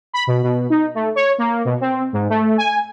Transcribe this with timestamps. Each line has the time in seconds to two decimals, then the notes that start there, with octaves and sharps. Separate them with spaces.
0.14 B5
0.27 B2
0.44 B2
0.70 D#4
0.95 A3
1.16 C#5
1.38 A#3
1.65 B2
1.81 C4
2.13 G#2
2.30 A3
2.58 G#5